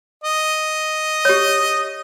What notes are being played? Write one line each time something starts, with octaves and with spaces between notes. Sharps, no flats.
D#5
G4 C#5